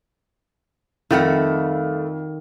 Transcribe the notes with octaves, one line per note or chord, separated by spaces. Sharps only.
F2 D#3 G3 A3 F#5